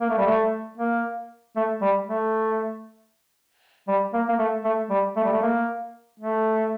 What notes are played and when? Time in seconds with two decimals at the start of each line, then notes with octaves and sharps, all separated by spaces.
0.01 A#3
0.10 A3
0.18 G3
0.27 A3
0.78 A#3
1.56 A3
1.82 G3
2.07 A3
3.88 G3
4.13 A#3
4.29 A#3
4.39 A3
4.65 A3
4.90 G3
5.17 A3
5.24 G3
5.33 A3
5.42 A#3
6.20 A3